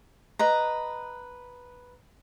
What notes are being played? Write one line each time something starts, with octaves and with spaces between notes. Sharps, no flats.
B4 D#5 A#5